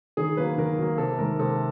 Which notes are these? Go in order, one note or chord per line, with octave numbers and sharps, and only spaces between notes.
D#3 G#4
F#3 A#3 B4
D#3 A#4
F#3 A#3
C3 A4
D#3 G#3 A#4
C3 A4